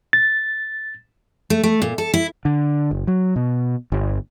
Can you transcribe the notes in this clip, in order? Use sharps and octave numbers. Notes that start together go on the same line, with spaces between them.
A6
A3
A3
A#2
A4
E4
D3
F#1
F#3
B2
G1